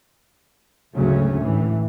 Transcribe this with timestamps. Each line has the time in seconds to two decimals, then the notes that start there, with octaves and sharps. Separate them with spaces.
0.95 G#1 D2 C#3 F#3 A3 C#4
1.40 A2 E3